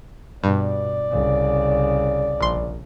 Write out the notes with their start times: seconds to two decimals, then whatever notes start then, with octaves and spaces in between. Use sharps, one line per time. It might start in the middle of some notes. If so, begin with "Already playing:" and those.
0.44 G2 B2 D5
1.11 C2 C#3
2.41 A#1 C6